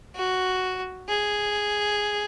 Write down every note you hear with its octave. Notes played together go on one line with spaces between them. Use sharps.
F#4
G#4